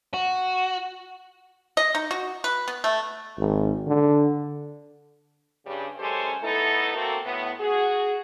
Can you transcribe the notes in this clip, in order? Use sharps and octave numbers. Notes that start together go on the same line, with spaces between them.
F#4
D#5
D#4
F#4
B4
B3
A3
G#1
D3
G2 C#3 G3
F#2 G#3 C#4 G4 A4 C5
A3 B3 D#4 E4 A4
A3 A#3 C4 F#4 A4 A#4
A2 B3
F#4 G#4